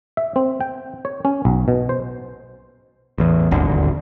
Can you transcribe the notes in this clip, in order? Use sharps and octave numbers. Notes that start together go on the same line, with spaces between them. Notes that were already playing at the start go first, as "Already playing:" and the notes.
E5
C4
G5
C#5
C#4
B1
B2
C5
A1 E2
D#1 G#1 D2 D3